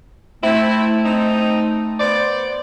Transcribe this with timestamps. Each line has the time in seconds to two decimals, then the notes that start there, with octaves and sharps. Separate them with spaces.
0.44 A3 C4 E4
1.05 C4 D#4
2.00 B3 C5 D5